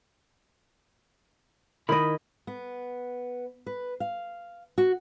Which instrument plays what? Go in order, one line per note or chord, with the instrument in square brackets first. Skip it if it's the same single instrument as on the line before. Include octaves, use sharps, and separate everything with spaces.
[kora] D#3 D#5 [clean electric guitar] E4 B5
[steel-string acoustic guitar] B3
B4
F5
F#4